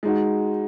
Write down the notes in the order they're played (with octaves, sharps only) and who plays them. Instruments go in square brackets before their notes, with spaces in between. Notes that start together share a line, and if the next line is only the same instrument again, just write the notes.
[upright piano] G#3 D#4 F#4